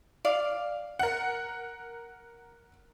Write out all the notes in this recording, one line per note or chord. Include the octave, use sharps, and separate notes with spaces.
D5 F5
A#4 F#5